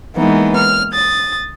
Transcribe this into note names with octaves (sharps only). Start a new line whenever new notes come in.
E3 G#3 A#3 B3 D#4
F6
D#6 A6